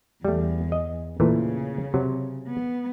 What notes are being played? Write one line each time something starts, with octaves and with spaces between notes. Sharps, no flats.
E2 G3 A3
D#5
A#2 C#3 E3 A3
C3 F#3
B3